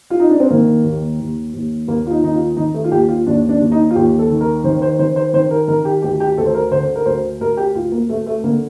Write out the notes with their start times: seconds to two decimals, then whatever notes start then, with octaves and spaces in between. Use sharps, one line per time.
0.10 F4
0.20 D#4
0.30 D4
0.40 C4
0.50 D#3 A#3
0.84 D#2
1.20 D#2
1.54 D#2
1.88 D#2 A#3
2.07 F4
2.11 D#4
2.23 D#3 D#4
2.35 F4
2.57 D#3 D#4
2.74 A3
2.84 F4
2.92 D#2 G4
3.08 F4
3.26 D#2 D4
3.49 D4
3.61 D#2
3.72 D#4
3.91 F4
3.96 D#2 G4
4.19 A4
4.30 D#3
4.41 A#4
4.64 D#3 C5
4.82 C5
4.99 D#3 C5
5.16 C5
5.34 D#3 C5
5.51 A#4
5.68 D#3 A#4
5.85 G4
6.02 D2 G4
6.20 G4
6.37 D2 A4
6.46 C5
6.54 A#4
6.71 D3 C5
6.96 A#4
7.06 D2 C5
7.40 D2 A#4
7.57 G4
7.74 D2 F4
7.92 A#3
8.09 D2 A3
8.26 A3
8.44 D3 A#3